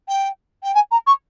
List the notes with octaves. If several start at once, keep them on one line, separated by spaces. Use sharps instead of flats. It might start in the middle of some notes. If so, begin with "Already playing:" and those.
G5
G5
G#5
A#5
C#6